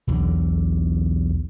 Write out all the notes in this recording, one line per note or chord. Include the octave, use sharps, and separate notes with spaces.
B1 E2 D3